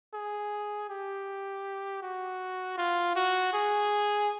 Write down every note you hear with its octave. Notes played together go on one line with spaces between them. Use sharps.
G#4
G4
F#4
F4
F#4
G#4